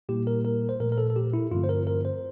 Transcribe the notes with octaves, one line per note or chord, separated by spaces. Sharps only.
A#2 G3 A#3 E4 G4
A#4
A#4
C5
A#2 F3 A3 A#4
A#4
A4
A4
G4
E4
G2 D3 F3 A3 C4 F4
C5
A#4
A#4
C5